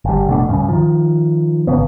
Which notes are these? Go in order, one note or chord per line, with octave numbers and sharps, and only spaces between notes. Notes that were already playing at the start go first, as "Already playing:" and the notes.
G1 G3
F1 B2 A3 D4
C#2 G2 C#3
D#3 F3
G#1 C#3 B3